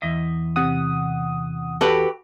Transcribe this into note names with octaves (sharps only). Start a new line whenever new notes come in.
E2 D#5 E5
C3 F#5 D#6
F#4 G4 A4 B4